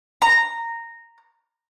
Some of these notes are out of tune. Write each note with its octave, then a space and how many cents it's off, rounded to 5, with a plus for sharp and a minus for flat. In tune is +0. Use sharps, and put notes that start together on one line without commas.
A#5 -10